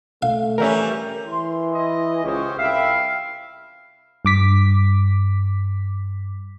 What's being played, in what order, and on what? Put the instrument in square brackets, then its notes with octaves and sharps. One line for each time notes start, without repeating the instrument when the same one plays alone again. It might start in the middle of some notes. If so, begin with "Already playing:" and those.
[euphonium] A3 [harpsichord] F5
[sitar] E3 G3 C#4 [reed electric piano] A#4 E5
[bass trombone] E3 [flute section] C6
[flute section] E4 [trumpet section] D#5
[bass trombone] C#2 [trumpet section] C#4 G4 C5 [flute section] C#6 D#6
[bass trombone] C2 [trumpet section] E5 [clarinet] F5 [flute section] G5 B5
[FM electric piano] G2 D6 B6